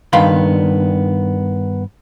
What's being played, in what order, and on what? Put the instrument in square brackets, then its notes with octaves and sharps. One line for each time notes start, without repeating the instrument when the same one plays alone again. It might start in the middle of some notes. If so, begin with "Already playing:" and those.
[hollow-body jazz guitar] G2 D#3 B3 F5 B5 C6